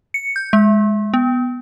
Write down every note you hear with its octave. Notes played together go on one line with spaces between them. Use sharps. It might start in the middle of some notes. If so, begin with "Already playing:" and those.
C#7
G6
G#3
B3